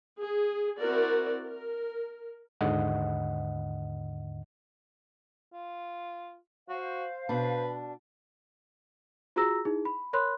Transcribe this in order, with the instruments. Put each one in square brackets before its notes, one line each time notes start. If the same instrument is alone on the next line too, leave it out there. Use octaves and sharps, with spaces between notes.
[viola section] G#4
C4 E4 F#4 A#4 D5
A#4
[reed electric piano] D#2 G#2 D3 D#5 F#5
[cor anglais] F4
[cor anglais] F#4 [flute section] C5 F5
[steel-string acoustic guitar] B2 D4 [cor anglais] B4
[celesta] F4 F#4 G#4 A#5 E6 A#6
D#4 E4 G#4
B5
A#4 C#5 B5 C6 F#6